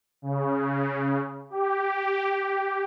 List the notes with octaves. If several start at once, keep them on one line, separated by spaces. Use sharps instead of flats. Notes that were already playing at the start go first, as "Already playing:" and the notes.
C#3
G4